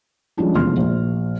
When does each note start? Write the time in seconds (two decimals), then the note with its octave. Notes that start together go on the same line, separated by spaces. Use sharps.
0.37 F3 G3 G#3 C#4 D4 F4
0.55 F1 E2 F3 C6 F6
0.77 A#1